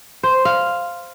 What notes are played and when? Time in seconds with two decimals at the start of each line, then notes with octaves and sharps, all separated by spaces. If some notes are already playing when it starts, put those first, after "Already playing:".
0.23 C5
0.45 F5